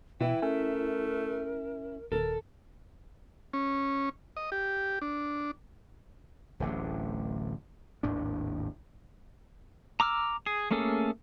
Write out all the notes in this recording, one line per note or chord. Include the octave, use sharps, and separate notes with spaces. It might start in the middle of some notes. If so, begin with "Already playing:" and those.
B2 E3 E4 G5
A3 C#4 A#4
D#1 A4 A#4
C#4
D#5
G4
D4
D1 A1 D3
G#1 D#2 A2 D4
A#5 D6 E6 F6
G#4
A3 A#3 C#4 G#4 A4